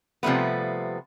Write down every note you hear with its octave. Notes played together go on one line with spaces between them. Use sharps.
C3 F3 G3 A3 B3